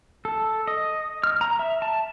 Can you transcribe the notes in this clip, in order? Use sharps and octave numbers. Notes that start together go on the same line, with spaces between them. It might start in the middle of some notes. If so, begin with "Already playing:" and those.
A4
D#5
F6
A#5
E5
A5